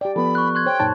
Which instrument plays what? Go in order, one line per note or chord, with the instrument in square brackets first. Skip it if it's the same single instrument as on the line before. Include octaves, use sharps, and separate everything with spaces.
[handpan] G4 D5 [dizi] G5
[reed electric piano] F3 B3 [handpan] A4 [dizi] B5
[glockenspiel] C#6 F#6
C6 F#6 G#6
[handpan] C5 C#5 [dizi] G5
[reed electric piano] F#2 A#2 A5 [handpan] D#4 C#5